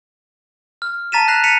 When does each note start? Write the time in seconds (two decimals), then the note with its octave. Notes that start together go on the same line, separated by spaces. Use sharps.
0.82 F6
1.12 A5 A#5 A6 B6 D#7 E7
1.28 F#6 A#6 C7 F7
1.44 A6 B6 C#7 D#7 F7